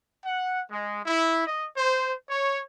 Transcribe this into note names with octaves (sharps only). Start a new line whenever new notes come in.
F#5
G#3
E4
D#5
C5
C#5